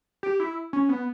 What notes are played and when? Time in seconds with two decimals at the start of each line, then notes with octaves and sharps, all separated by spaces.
0.23 G4
0.40 E4
0.73 C#4
0.89 B3